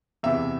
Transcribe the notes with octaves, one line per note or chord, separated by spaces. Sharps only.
E2 C3 E3 E5